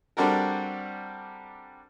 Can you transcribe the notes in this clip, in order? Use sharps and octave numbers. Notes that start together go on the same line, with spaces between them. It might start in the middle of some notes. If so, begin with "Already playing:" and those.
G3 C4 D4 F#4 A4 A#4